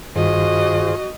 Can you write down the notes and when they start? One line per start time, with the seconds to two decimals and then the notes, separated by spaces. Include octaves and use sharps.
0.16 G2 D#3 F4 F#4 G#4 C5 D#5